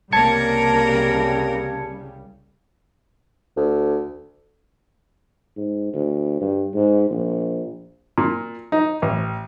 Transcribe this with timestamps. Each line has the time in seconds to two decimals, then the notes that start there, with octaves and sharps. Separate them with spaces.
0.12 C2 C#3 G3 A#3 A#4 A5 G#6 C#7
3.57 D2
5.57 G#2
5.93 D2
6.41 G2
6.74 G#2
7.11 A#1
8.18 A#2
8.72 D#4
9.02 A1